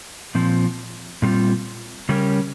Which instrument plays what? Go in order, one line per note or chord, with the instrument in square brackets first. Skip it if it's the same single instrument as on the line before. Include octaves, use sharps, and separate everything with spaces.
[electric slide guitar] A#2 F3 C4
A#2 G3 C4 F4
C#3 G3 C#4 G4 A#4